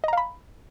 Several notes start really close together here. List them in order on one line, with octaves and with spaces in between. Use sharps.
D#5 A#5 F5 B5